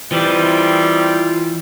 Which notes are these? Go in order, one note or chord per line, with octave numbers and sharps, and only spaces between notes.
D#3 E3 G3 C4 F4